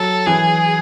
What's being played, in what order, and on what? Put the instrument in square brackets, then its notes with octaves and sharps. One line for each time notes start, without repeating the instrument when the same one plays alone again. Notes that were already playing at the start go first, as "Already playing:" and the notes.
Already playing: [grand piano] F#3 [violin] A4
[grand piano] E3 [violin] G#4